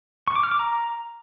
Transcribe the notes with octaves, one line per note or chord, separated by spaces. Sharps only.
C#6
D6
F6
D6
A#5